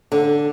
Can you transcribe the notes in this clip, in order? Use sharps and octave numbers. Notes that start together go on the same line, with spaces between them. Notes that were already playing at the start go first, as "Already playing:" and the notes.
D3